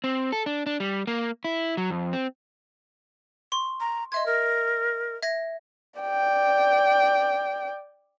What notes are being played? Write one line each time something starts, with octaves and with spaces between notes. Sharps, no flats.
C4
A4
D4
D4
G3
A#3
E4
F#3
F2
C4
C6 C#6
A#5
D#5 E5 C6 G#6
A#4
E5 G#6 A#6
D5 G5